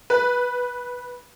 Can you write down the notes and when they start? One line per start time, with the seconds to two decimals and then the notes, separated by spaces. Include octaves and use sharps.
0.10 B4